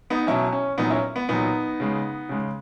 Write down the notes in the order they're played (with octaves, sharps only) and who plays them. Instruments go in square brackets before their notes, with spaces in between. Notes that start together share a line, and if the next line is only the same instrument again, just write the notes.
[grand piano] B3 D#4
B2 F#3 C#4 E4
C#4
A#2 F#3 B3 D#4
C#4 E4
B3
A#2 F#3 B3 D#4
C#3 G#3
C#3 G#3